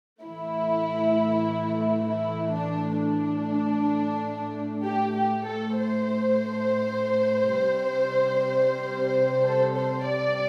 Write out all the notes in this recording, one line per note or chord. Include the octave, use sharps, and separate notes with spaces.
A2 E3 A3 E4
E4
D4
D4
A2 A3
G4
G4
A4
C5
C3 G3
A4
C5
D5